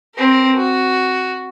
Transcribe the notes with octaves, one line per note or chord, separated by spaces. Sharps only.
C4 A#4
F#4